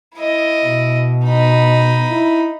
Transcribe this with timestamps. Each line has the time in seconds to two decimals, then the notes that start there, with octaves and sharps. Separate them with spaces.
0.15 E4 D#5
0.65 B2
1.25 D#4 B5
2.09 E4